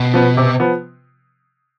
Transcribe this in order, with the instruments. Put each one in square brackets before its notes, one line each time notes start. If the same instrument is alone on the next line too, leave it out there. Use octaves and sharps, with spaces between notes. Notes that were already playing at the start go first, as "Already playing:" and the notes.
Already playing: [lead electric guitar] B2
[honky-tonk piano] F3 B3
C3
F3 B3